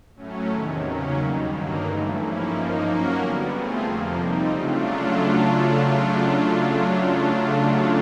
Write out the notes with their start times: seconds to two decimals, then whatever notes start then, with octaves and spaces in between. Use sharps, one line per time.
0.15 A2 F#3 A3 C#4
0.48 E2 C3 D#3
0.82 C#3 F#3 A#3 C#4
1.15 D#2 D#3 G3
1.48 G2 D3 F#3 A#3 D#4
1.82 G2 E3 A3
2.15 G#2 F3 A#3 C#4 E4
2.49 F3 A#3 D#4
2.83 F#3 A#3 C#4 F#4 A#4
3.16 D3 G3 B3
3.49 A3 C4 F4 G#4
3.83 F2 C3 F3 A#3
4.16 G3 C4 D#4
4.50 C#3 F#3 A3 D4 F4